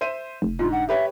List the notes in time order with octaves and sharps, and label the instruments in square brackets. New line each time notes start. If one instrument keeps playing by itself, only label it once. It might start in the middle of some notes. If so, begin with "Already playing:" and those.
[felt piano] C5 E5 D#7
[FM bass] F1
[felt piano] G#2 D3 [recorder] F4
[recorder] F#5
[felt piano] G4 B4 C#5 [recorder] E5